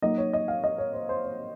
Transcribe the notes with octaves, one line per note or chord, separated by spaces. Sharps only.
F#3 A#3 D#4 D#5
C#5
D#5
F5
D#5
C#5
C5
C5
C#5